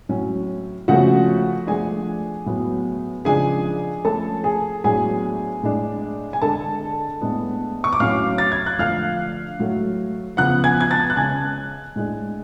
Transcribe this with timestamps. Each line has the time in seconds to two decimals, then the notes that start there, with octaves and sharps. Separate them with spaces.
0.09 A2 F#3 C#4
0.88 C#3 F3 A3 C#4 F#4 F#5
1.67 F3 A3 D4 G#4 G#5
2.46 A2 F#3 B3
3.25 C#3 F3 G#3 D4 G#4 G#5
4.04 F3 A3 C#4 A4 A5
4.44 G#4 G#5
4.84 A2 F#3 B3 D4 G#4 G#5
5.63 A2 G#3 D4
6.33 G#5
6.42 D3 G#3 D4 A4 A5
7.21 A2 G#3 B3 D4
7.84 C#6
7.93 D6
8.00 A2 F#3 C#4 F5 F6
8.38 A6
8.52 G#6
8.66 F#6
8.79 D3 F3 A3 D4 F5 F6
9.59 A2 F#3 A3
10.37 C#3 F3 B3 F#5 F#6
10.64 G#5 G#6
10.80 G#6
10.91 A5 A6
11.10 F#6
11.16 C#3 G#3 C#4 G#5 G#6
11.96 A2 G#3 D4